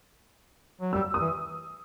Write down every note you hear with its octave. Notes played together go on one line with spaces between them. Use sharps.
F#3
G3 E6
D#6
E3